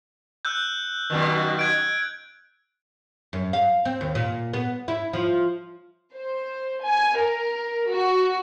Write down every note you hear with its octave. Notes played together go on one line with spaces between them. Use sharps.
E6 F#6 G6
F#2 B2 D#3
F#6 G#6 D7
F#2
F5
C4
D#2
A#2
B3
E4
F3
C5
G#5
A#4
F#4